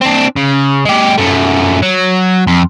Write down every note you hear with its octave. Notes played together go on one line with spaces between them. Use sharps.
C4 D4
C#3
G#3 G4
F#2 A3
F#3
F2